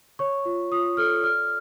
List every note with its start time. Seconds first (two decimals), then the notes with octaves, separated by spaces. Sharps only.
0.19 C#5 C#6
0.45 F4
0.72 F4 D#6
0.97 A4 F6
1.23 D5 F6